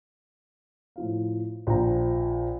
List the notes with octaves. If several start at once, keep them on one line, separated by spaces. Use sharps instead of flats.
A2 F3 F5
A#1 F3 G5 A#5